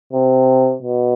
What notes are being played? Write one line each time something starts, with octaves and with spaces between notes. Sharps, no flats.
C3
B2